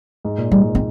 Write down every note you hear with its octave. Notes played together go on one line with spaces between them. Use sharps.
G#2
A#2
G#2 G3
C4